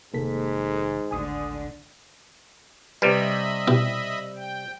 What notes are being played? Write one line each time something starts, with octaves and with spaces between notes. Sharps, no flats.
F1 G#2 C3 D#3 A#3 A4 B6
D1 G#1 D3 G#5 D#6
C3 G3 B4 D#5 E5 B5
B2 E4 G4
G5